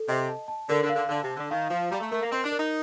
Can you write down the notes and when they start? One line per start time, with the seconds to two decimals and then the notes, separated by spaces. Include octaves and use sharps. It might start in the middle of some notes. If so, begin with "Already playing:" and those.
Already playing: A4
0.08 C3 D#5
0.29 A5
0.48 A5
0.69 D3 A#4
0.83 D3
0.89 F5
0.95 D3
1.09 D3 A5
1.23 C3
1.30 A5
1.37 D3
1.51 D#3 F5
1.70 F3 F5
1.91 G3 A#5
2.00 A3
2.11 A3 A#4
2.22 A#3
2.32 C4 D#5
2.44 D4
2.52 A#4
2.59 D#4